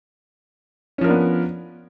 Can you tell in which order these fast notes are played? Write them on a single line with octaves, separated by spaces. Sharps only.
C#4 F3 A#4 D4 B3